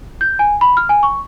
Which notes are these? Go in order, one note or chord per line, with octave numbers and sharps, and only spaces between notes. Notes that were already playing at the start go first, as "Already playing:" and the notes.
G6
G#5
B5
F6
G#5
C#6